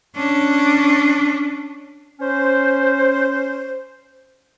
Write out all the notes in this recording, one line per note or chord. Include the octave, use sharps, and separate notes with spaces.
C#4 D4
C#4 C5